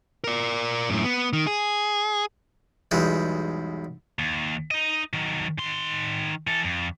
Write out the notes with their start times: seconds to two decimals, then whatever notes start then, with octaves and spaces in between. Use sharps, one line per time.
0.24 A#4 D5
0.90 F#2 A2
1.04 B3
1.33 D#3
1.47 G#4
2.91 B1 E2 G3 G#3
4.19 D#2
4.71 D#4 D#5
5.13 D#3 F#3
5.58 D#3 C6
6.47 E3 A4
6.64 F2